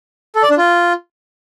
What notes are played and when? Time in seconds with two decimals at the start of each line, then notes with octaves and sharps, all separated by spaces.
0.36 A4
0.43 D5
0.50 D4
0.58 F4